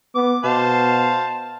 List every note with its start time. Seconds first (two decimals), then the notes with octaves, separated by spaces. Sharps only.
0.15 B3 D6
0.44 B2 C5 F5 A5